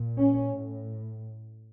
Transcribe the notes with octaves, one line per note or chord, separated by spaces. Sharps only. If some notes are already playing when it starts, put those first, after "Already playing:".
Already playing: A#2
C#4
A2